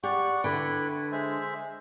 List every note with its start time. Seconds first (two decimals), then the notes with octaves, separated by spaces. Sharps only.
0.04 G4 D5 F#5 C#6
0.44 D3 E4 B4 G5 B5
1.12 G#3 C5 E5